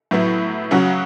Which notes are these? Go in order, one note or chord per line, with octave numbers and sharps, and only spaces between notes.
A2 F#3 B3 E4
C#3 F#3 C#4 F#4